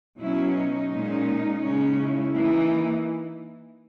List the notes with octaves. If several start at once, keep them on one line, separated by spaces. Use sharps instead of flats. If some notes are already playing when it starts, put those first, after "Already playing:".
B2 F#3 C#4 E4
D#4
A#2 G#3 C#4
C#3 G#3 C#4
E4
E3 A#3 D#4